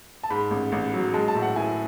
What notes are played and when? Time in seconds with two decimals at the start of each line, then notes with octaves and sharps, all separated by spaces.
0.23 A5
0.30 G#2 B5
0.51 A1
0.72 A1
0.93 F#3
1.14 G#3 A5
1.28 A5
1.35 A2
1.42 F#5
1.56 E4 G#5